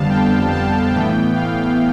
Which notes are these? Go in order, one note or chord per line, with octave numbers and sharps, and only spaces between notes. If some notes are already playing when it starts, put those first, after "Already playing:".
Already playing: F2 D3 G3 B3 F5 A5
G5
A5
A2 E3 B3 G5
F5